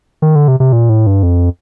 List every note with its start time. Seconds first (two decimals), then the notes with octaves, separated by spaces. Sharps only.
0.22 D#3
0.35 D3
0.48 C3
0.60 C3
0.73 A#2
0.89 A2
1.07 G2
1.23 F2